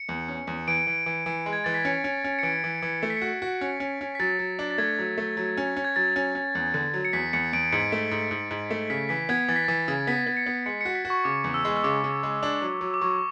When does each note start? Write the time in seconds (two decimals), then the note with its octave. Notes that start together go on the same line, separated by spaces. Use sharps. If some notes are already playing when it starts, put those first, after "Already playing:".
Already playing: C#7
0.09 E2
0.28 C#4
0.47 E2
0.68 E3 D7
0.87 E3
1.06 E3
1.26 E3
1.46 G#3
1.53 G#6
1.64 E3 A6
1.74 B6
1.85 C#4 C#7
2.04 C#4
2.24 C#4
2.39 C#7
2.43 E3 D7
2.64 E3
2.82 E3
3.02 A3 C#7
3.10 B6
3.17 C#7
3.22 F#4
3.42 F#4
3.61 C#4
3.80 C#4
4.01 C#4
4.15 B6
4.20 F#3 A6
4.39 F#3
4.59 D4
4.71 A6
4.78 A3 G#6
4.99 F#3
5.18 A3
5.37 F#3
5.57 C#4
5.76 C#4
5.85 G#6
5.96 F#3 A6
6.16 C#4
6.35 C#4
6.55 E2
6.74 D3
6.94 F#3
7.05 C#7
7.13 E2 B6
7.33 E2 C#7
7.53 E2 D7
7.72 G#2 C#7
7.92 A3
8.11 G#2
8.31 G#2
8.51 G#2
8.71 A3
8.90 C#3 B6
9.09 E3 B6
9.29 B3 G#6
9.48 E3 A6
9.56 B6
9.64 E3 A6
9.88 C#3
10.07 B3 B6
10.27 B3
10.37 C#7
10.46 B3
10.66 G#3 C#7
10.81 F#4 C#7
10.95 B6
11.05 F#4
11.10 C#6
11.24 C#3 D6
11.44 E2
11.54 E6
11.65 G#3
11.77 E6
11.83 C#3 D6
12.04 C#3
12.23 G#3
12.43 D4
12.62 F#3
12.81 F#3
12.94 D6
13.01 F#3 C#6